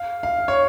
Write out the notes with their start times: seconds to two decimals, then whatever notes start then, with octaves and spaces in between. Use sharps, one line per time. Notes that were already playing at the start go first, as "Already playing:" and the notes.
Already playing: F5
0.23 F5
0.48 C#5